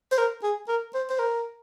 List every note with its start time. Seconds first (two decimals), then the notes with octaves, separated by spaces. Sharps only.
0.12 C5
0.18 A#4
0.43 G#4
0.68 A#4
0.94 C5
1.10 C5
1.19 A#4